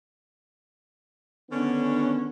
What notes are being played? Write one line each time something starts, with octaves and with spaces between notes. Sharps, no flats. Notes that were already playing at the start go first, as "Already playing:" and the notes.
D3 D#3 B3 C#4 D4